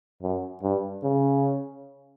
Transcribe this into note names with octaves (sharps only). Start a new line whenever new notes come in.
F#2
G2
C#3